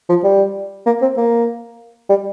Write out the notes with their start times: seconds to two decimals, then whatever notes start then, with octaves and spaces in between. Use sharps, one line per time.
0.09 F3
0.24 G3
0.86 A#3
1.02 C4
1.17 A#3
2.09 G3